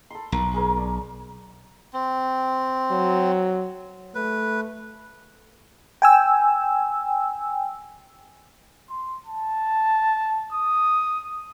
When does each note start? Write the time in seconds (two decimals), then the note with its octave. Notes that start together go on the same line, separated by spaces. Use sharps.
0.10 A4 B5 C6
0.32 B1 A#4
0.54 G#4 A#4 C#5
0.77 A4 D5
1.93 C4
2.91 F#3
4.15 A3 B4
6.02 G5 G#5 E6
8.90 C6
9.26 A5
10.53 D#6